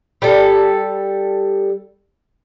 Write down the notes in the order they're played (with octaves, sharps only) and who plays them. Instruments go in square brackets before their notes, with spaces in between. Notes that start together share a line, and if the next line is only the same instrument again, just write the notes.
[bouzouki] G3 A4